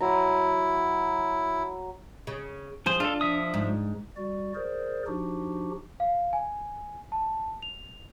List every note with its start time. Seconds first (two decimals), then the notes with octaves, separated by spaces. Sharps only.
0.01 F#3 E4 A#5
2.27 C#3
2.86 F3 G#4 C5
3.00 D4 F4 A4
3.21 F3 E5 D#6
3.54 G#2
4.17 G3 F#4 D5
4.55 G#4 A#4 C5 D5
5.07 F3 D4 D#4 F#4 G4
6.00 F5
6.33 G#5
7.12 A5
7.62 F7